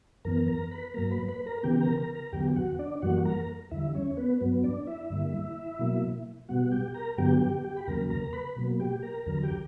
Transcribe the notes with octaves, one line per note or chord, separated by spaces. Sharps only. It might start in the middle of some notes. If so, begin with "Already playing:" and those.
F#2 E3 B3 A#4 A#5
A#4 A#5
B4 B5
G2 F#3 A#3 A#4 A#5
B4 B5
B4 B5
A#4 A#5
C#3 E3 B3 G4 G5
A#4 A#5
A#4 A#5
A#4 A#5
E2 D3 F#3 B3 G4 G5
F#4 F#5
D4 D5
F#2 E3 G3 A#3 F#4 F#5
A#4 A#5
E2 D3 G3 E4 E5
C#4 C#5
B3 B4
G2 F#3 B3
D4 D5
E4 E5
G2 D3 G3 A#3
B2 F#3 A#3
B2 G3 B3 F#4 F#5
G4 G5
A#4 A#5
G2 D3 F#3 B3 G4 G5
G4 G5
G4 G5
B5
E2 C#3 F#3 A#3 A#4 A#5
A#4 A#5
B4 B5
B2 F#3 A#3
G4 G5
A#4 A#5
E2 D3 F#3 A#4 A#5
G4 G5